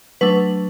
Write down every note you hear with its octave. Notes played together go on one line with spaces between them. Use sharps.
F#3 A3 D4 B4